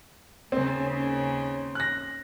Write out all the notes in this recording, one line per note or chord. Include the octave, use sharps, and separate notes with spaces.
D#2 C#3 C4
F#6 A#6